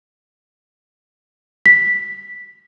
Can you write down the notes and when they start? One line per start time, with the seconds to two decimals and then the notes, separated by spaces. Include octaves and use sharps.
1.66 B6